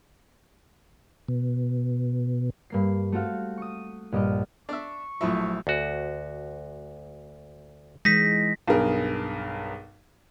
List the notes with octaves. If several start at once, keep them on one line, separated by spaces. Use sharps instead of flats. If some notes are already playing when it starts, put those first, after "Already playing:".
B2
G2 A#3 C7
A3 C4 F#4 F5
C#6 D#6
A#1 G2 D#5 D6 F6
D4 E5 C#6
A#1 F3 F#3 A3 E4 E5
D2 F#4
E3 G#3 D#4 A#6 B6
B1 G2 G#4 A#4